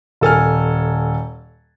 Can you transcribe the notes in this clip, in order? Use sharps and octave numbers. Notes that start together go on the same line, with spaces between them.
D#1 A4 G#5 F6